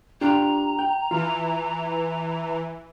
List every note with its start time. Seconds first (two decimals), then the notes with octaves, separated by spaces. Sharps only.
0.21 D4 F4 G4 A#5
0.79 G5
1.11 E3 F4